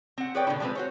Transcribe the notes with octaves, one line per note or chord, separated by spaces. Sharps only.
C4 F#5
G#4 B4 C#5 D5 G5
B2 D3 D4 E4
F3 G#3 A#3 C4 B4
F#4 C5 C#5